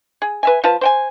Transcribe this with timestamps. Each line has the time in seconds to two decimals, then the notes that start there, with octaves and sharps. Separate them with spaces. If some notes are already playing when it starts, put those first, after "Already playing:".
0.22 G#4
0.43 B4 E5 G#5
0.64 F3 F4 B4 A5
0.81 C5 G5 G#5